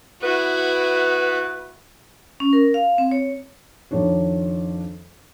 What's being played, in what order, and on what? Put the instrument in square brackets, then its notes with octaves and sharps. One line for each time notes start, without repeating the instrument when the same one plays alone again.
[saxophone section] B3 B4 [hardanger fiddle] E4 F#4
[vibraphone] C#4
A#4
F5
C4
C#5
[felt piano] F2 D#3 D4 C#5